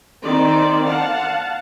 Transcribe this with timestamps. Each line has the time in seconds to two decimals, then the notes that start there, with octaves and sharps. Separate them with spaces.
0.23 D#3 C4 D5
0.84 F5 F#5 A5